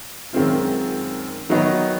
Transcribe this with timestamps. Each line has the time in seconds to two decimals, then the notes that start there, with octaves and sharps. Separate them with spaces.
0.33 F#2 D#3 G#3 C4 F4
1.49 D#3 F#3 B3 D#4